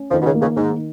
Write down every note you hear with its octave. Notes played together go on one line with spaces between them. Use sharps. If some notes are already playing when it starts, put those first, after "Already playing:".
Already playing: C#4
F2 D#3 F3
B2
C#2 C#3
A#3
C#2 C#3
G#2 D#3